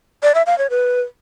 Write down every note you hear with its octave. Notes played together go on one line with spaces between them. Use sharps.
D5
E5
F5
C#5
B4